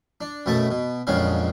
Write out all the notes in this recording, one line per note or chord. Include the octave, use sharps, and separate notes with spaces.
D4
F#2 B2 A3 A5
B2
A#1 F2 C#3 F#3 G#3 F5